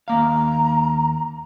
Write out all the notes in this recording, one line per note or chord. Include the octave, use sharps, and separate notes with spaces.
D#2 A#3 F5 A#5